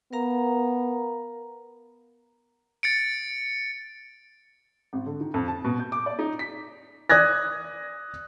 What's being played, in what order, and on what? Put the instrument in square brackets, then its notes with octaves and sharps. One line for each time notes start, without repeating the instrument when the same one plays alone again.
[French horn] B3 [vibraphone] A#4 F5 A#5
[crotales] A6 C#7 D7
[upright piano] G#1
D3
D#3
F2
A5
B2
G6
D6
D5
D#4
B6
[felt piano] D5 D#6 F#6 G#6 A#6